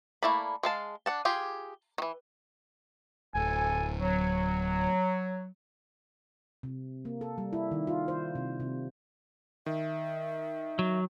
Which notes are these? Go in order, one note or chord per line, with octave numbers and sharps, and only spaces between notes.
A3 A#3 E4 D5 B5
G#3 F5 A5
D4 F#5 A5
F4 G4 G#4
D#3 E3
D1 D2 A4 G#5
F#3
C3
A#3
A4
G3
E4
D#3
F4
C5
C3
C3
D#3 E5
F#3